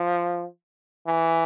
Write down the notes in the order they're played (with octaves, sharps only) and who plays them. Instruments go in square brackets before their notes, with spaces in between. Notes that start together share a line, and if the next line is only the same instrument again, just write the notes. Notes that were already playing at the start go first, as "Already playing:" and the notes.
Already playing: [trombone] F3
E3